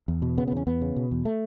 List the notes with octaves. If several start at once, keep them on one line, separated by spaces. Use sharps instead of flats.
E2
B2
C#3 B3
B3
E2 C#4
E2 B3
C#3
B2
E2
A3